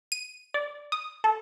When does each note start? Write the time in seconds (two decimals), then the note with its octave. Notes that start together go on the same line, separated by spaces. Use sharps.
0.12 D#7
0.54 D5
0.92 D#6
1.24 A4